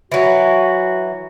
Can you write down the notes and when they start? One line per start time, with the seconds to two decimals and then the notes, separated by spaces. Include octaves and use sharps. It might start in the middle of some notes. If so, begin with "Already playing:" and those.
0.12 E3 F#3 F#4